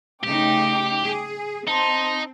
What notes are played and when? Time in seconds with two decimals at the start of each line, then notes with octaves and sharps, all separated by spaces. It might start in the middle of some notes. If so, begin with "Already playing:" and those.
0.23 C#3 A3 D#4 G4 G5 D6
1.02 G#4
1.68 C4 D#4 A5 C6